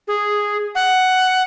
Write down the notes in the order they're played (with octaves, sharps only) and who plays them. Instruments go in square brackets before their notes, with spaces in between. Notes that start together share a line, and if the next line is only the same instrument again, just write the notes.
[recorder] G#4
F#5